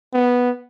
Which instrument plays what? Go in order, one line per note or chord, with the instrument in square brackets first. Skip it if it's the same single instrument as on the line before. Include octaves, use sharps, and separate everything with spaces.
[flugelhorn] B3